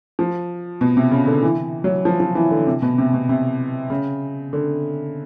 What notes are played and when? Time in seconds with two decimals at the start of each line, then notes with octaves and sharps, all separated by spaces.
0.19 F3
0.81 B2
0.97 C3
1.11 C#3
1.27 D3
1.42 E3
1.84 F#3
2.05 F3
2.20 F3
2.35 E3
2.51 D3
2.67 C3
2.82 B2
2.98 C3
3.14 B2
3.29 C3
3.90 C#3
4.53 D3